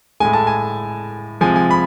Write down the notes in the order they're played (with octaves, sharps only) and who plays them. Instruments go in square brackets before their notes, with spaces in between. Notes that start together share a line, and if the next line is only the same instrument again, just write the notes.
[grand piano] A2 G#3 G#5
A5
G#5
C3 F3 G#3 G#5
G#5
B5